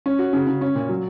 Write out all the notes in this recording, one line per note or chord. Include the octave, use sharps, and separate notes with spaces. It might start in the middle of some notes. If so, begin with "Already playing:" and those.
C#4
F#4
C#3
C#3
C#4
A#2
F#3